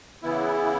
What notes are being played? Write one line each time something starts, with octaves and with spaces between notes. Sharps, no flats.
C#3 E3 B3 E4